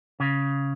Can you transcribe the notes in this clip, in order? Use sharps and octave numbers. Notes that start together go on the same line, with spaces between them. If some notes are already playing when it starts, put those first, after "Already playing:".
C#3